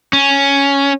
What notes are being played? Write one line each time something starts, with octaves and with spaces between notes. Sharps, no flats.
C#4